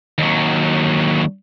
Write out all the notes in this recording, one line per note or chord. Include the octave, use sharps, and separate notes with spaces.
D#2 F#3